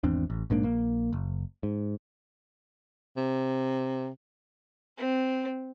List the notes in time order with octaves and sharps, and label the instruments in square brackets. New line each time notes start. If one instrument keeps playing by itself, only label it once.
[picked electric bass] G#1 E2 C4 D4
A1
A#1 G#2 A#3 D4
A#1 A#3
F#1
G#2
[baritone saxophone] C3
[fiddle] C4